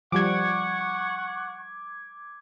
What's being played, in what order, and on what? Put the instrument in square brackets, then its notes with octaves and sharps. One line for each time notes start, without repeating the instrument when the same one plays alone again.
[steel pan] F3 G3 [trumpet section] F#5 C#6 [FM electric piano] D6 G#6